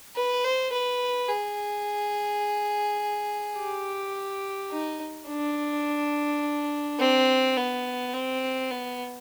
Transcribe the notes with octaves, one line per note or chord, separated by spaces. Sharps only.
B4
C5
B4
G#4
G4
D#4
D4
C4
B3
C4
B3